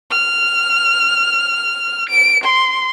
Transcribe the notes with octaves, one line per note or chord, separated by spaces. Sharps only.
F6
D7
C6